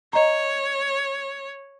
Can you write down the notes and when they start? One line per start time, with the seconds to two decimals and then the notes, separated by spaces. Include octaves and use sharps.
0.13 C#5 D#5 A#5